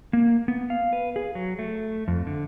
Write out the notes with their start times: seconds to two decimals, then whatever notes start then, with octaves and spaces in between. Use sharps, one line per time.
0.13 A#3
0.48 B3
0.70 F5
0.93 B4
1.16 G#4
1.35 F#3
1.59 A3
2.08 F2
2.27 D3